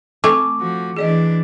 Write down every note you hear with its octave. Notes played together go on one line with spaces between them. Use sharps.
A3 C4 A4 G#5 D6
F3 F#4
E3 D4 G#4 D5 D#5